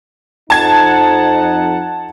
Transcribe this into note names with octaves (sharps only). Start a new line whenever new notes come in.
F2 D#4 F#5 A5 G#6